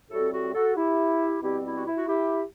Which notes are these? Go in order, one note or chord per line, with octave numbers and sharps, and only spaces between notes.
A2 G3 C4 F#4 A4
F#4 A4
F#4 A4
E4 G4
B2 G3 C4 E4 G4
E4 G4
F#4
E4
F#4
E4 G4